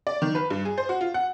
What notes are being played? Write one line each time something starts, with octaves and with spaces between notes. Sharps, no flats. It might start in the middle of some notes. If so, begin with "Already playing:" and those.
D5
D#3
B4
G2
G#4
C5
F#4
F4
F#5